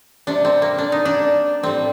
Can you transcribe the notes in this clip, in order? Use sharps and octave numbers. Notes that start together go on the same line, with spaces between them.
C3 G3 D4
C4
A#3
D4
D#4
D4
A2 G3 C4